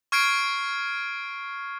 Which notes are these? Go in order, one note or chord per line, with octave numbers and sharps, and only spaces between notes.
C#6 F6 G#6 C7 D7